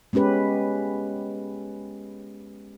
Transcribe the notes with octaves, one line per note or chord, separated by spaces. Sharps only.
G#3 B3 C#4 G4 B4